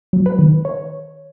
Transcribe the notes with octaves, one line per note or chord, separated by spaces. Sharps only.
F#3
B4
D#3
C#5